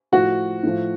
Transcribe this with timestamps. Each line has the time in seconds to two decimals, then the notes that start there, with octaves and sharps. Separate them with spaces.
0.12 A2 F3 F#4
0.63 A2 F3